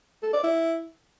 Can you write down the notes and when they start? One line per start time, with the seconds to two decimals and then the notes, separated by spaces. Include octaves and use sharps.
0.23 A4
0.33 D5
0.43 E4